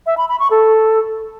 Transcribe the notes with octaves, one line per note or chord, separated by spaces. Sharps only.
E5
B5
B5
C#6
A4